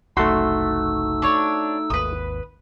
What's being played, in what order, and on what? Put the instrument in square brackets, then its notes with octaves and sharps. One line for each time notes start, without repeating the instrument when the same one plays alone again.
[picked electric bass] F#1 C2 [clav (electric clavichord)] A3 F#4 [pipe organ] D#4 E6 [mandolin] C6
[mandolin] D4 C#5
[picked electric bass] G#1 D#2 [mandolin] B4 D#6